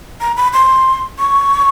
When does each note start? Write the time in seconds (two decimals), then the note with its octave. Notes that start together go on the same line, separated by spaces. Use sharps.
0.21 A#5
0.37 B5
0.53 C6
1.19 C#6